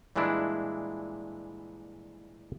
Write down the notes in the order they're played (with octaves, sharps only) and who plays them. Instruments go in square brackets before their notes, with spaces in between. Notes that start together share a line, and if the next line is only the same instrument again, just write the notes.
[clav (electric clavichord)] A#2 E3 G3 G#3 D4 E4